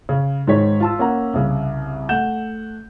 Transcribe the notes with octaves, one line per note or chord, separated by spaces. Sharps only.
C#3
G#2 D#3 G#4 C#5 B6
F4 A5 E6
A#3 C#4 A#4 F#5 A#5
C2 C#3
A3 F#5 G6 E7